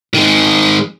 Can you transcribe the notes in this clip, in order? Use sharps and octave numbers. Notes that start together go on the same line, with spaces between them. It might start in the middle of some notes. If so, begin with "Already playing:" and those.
D#3 G#3